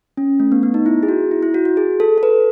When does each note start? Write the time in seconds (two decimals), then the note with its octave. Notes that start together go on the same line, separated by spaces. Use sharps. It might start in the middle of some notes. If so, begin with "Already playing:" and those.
0.17 C#4
0.40 A3
0.52 B3
0.63 B3
0.74 D#4
0.86 E4
1.03 G#4
1.08 F#4
1.31 E4
1.43 E4
1.54 F#4
1.65 F#4
1.77 G#4
2.00 A4
2.18 A4
2.23 B4